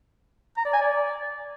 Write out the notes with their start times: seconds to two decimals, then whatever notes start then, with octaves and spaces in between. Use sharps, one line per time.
0.57 A#5
0.65 D5
0.73 G#5
0.81 D5